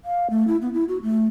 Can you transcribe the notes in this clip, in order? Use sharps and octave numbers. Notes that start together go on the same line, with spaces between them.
F5
A3
E4
B3
E4
F#4
A3